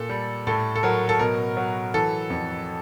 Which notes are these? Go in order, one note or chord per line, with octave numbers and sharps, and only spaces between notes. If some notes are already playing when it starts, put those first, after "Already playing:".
Already playing: A#2 A4
G3
A2 A4
A4
F#3 A#4
A4
B2 A#4
F#3
E3 A4
F2